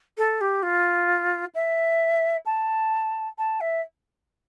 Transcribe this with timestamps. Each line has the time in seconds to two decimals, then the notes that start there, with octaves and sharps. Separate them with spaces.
0.18 A4
0.41 G4
0.63 F4
1.55 E5
2.46 A5
3.38 A5
3.61 E5